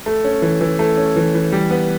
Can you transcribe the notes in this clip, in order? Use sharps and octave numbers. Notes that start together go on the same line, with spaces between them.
A3
C#4
E3
E3
A3
C#4
E3
E3
G3
B3